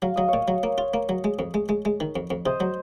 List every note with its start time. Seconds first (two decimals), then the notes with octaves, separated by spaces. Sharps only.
0.02 F#3 F5
0.16 F#3 D#5
0.28 C#5 F5
0.33 A#2
0.48 F#3
0.63 A#3
0.78 F4
0.94 A#3
1.09 F#3
1.24 G#3
1.39 F2
1.54 G#3
1.69 G#3
1.85 G#3
2.00 D#3
2.16 F2
2.31 F2
2.45 C3 C5 D#5
2.60 F#3